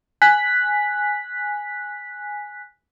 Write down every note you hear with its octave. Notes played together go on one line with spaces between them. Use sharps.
G#5 F#6 B6